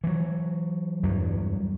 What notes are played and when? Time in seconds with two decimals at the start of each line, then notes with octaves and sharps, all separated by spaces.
0.04 E3 F#3
1.03 E2 G2 F#3